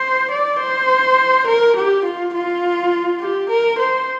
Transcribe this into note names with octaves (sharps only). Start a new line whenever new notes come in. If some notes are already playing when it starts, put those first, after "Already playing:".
Already playing: C5
D5
C5
A#4
G4
F4
F4
G4
A#4
C5